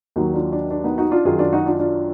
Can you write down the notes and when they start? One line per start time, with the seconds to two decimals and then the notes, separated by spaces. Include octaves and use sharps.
0.16 D#2 D#3 F#3 D#4 F#4
0.34 D4 F4
0.52 D4
0.71 D4
0.84 B3 D#4
0.98 D#4 F#4
1.11 D4 F4
1.25 F#2 D#3 F#3 F4 G#4
1.39 D4 F4
1.53 D#4 F#4
1.66 D4 F4
1.80 D4 F4